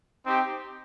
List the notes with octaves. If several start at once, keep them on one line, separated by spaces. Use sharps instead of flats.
C4 D#4 G4